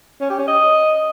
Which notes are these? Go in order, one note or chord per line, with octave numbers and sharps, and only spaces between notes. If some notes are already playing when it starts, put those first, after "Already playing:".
C#4
G4
C#4
D#5